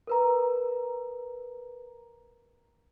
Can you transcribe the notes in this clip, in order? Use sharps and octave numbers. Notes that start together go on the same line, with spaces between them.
A#4 B4 A#5